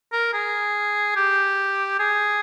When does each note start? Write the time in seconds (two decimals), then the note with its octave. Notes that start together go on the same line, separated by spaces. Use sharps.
0.12 A#4
0.34 G#4
1.16 G4
2.00 G#4